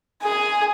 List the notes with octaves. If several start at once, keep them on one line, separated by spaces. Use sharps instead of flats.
G#4